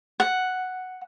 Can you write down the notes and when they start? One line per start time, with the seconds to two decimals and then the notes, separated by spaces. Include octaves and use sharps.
0.20 F#5